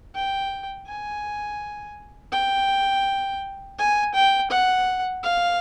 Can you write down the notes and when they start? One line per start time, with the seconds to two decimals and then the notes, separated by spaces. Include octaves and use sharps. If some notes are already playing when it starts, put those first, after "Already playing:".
0.15 G5
0.87 G#5
2.32 G5
3.79 G#5
4.14 G5
4.51 F#5
5.24 F5